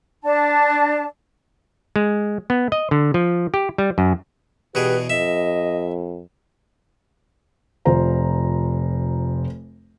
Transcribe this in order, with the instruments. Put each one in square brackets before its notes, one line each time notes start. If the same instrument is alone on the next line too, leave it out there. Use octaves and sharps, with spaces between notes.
[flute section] D4 A5
[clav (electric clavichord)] G#3
B3
D#5
D3
F3
G4
G3
F#2
[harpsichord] E2 B2 G#4 [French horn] G4 [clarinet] B4
[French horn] F2 [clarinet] D#5 [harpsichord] E5
[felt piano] F1 F4 C5 A#5